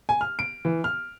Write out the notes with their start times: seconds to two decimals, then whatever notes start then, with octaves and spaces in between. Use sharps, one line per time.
0.09 G#5
0.21 F6
0.39 D7
0.65 E3
0.84 F6